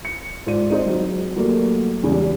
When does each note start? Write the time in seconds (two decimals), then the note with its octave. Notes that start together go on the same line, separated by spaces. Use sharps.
0.05 C#7
0.46 G#2 F4 D5 D#7
0.70 C4 D#4 G#4 C5 D#5
0.86 F#3
1.36 F#3 G3 A3 A#3
2.03 E2 C#3 G3 G#3